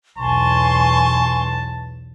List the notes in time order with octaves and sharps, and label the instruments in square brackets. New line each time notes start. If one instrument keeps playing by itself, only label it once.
[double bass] B1 E2 [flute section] G#5 C6 C#6 [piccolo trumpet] A5